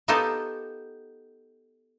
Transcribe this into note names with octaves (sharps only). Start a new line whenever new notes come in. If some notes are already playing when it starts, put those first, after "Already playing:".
B3 D#4 F4 G4 A4 A#4